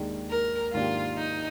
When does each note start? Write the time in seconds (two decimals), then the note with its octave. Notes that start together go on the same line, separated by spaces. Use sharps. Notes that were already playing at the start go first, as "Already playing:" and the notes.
Already playing: D#2 D#3 G#3 D4
0.30 A#4
0.73 G#2 D#3 A#3 D4 F4 G4
1.17 D#4